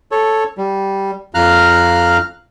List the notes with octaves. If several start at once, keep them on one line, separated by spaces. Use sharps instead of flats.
A4 C#5
G3
F2 F5 A#5 F6 F#6